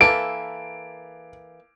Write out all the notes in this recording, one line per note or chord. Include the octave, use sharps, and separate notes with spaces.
E3 A#3 A4 D7